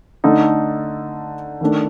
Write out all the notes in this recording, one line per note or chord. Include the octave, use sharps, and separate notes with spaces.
D3 A3 D#4
D#3 A3 D4